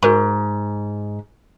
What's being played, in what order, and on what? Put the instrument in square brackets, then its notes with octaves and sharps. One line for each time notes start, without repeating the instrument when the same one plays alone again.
[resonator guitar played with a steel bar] G#2 [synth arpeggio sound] F#4 A#4 A#5